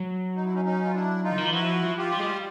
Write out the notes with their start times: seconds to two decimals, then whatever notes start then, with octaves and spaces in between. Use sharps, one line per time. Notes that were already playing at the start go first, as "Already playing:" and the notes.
Already playing: F#3
0.36 D#4
0.44 E4
0.54 C#4 D#4
0.65 C#4 D#4
0.85 F4
0.94 D4 E4
1.23 D#4 F4
1.31 D3
1.38 D#3
1.46 E3
1.53 F3 E4 F#4
1.83 F3
1.98 F4 G4
2.12 G3
2.19 G#3
2.26 G3